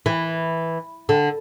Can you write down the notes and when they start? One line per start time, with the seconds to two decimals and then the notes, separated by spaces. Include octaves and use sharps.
0.06 E3
1.09 D3